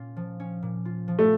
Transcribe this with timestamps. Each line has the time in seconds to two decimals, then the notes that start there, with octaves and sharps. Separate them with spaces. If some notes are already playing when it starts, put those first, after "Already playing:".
Already playing: A#2 C#4 F4
0.17 F3
0.40 C#4
0.62 A#2
0.85 F4
1.08 F3
1.19 A3